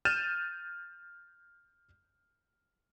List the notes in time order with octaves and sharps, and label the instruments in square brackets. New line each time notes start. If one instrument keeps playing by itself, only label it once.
[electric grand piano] F6 G6 A6 D#7 E7